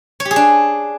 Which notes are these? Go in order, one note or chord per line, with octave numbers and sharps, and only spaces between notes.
C#5
G4
G#4
D4